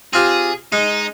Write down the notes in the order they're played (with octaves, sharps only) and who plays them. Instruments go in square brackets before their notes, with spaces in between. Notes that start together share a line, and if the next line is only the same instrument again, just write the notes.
[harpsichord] C4 F4 G4 [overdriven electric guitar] G#4
[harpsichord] G#3 [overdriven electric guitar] D#4